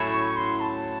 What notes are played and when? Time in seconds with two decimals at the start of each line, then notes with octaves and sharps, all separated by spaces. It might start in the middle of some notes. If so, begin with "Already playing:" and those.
Already playing: A2 F#3 C#4 E4
0.13 C#6
0.37 C6
0.60 A5